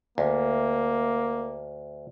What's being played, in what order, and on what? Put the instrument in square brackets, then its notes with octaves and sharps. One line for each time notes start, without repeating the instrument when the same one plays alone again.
[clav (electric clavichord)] D2 [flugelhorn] A#3